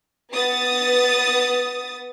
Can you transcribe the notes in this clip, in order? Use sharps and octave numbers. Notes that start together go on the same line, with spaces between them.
B3 D#6 A6